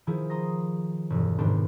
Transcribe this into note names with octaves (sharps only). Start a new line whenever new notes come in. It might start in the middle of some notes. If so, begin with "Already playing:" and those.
D#3 F3 E4 G#4
A#5 C6 D#6 A#6
E1 G2
F1 G#2 D#3 B3 D4 C6